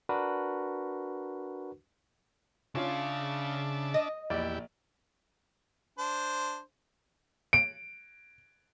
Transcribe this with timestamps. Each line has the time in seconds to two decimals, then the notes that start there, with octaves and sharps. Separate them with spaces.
0.09 D4 F#4 A#4 B4
2.75 C#3 C#4 D4 F4 E5 F5 A5
3.94 D#5
4.30 A#1 E2 E4 G4 D5
5.99 D4 C5
7.53 D7